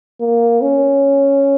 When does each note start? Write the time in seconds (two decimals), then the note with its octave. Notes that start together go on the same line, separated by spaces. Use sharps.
0.21 A#3
0.62 C#4